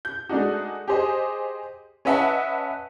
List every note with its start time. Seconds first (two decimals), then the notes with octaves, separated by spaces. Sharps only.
0.05 G6
0.29 G#3 A3 D4 D#4 F#4
0.88 G4 G#4 C5 D#5
2.05 C#4 B4 D#5 E5 F#5 A5